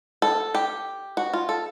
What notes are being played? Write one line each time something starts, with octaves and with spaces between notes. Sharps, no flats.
A4
G4
F#4
F4
A4